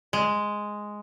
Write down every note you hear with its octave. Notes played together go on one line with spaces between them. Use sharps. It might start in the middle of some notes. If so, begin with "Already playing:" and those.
G#3